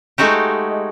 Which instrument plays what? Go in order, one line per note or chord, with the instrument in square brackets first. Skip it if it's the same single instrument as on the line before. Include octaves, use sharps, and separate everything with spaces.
[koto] G#3 A3 D#4 F#4 G4